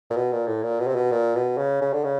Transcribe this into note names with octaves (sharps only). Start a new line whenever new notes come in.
A#2
B2
A#2
A2
A#2
B2
C3
B2
A#2
B2
C#3
C#3
D3
C#3